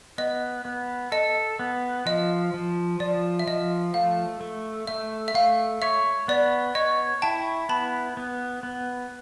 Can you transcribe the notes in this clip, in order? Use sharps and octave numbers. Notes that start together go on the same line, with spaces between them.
B3 D#5
B3
A4 D#5
B3
F3 D#5
F3
F3 D5
E5
F3 D#5
A3 F5
A3
A3 E5
E5
A3 F5
C#5 E5
B3 D5
C#5 D#5
E4 G5 A5
B3 A5 B5
B3
B3